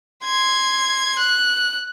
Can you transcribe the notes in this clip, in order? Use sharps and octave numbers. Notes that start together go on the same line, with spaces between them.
C6 G#6
F#6